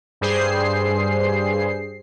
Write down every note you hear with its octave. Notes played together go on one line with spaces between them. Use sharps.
G2 G3 G#4 C5 C7